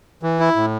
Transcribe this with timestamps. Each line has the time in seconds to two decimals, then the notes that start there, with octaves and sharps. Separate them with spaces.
0.23 E3
0.39 E4
0.56 A2